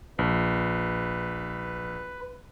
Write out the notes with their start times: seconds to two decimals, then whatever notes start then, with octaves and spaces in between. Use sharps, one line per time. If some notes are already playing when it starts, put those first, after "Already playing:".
0.19 A#1 B4